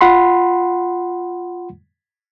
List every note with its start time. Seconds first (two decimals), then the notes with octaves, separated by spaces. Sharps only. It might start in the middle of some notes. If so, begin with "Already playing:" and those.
0.01 F4 F#5 B5 C6